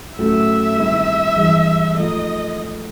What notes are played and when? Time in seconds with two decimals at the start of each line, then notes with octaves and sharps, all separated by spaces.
0.18 A2 F#3 A3 C#4 E5
0.77 G2 D#3 G#3 C4 E4
1.36 A1 G2 E3 G#3
1.95 G#2 F3 A3 D#5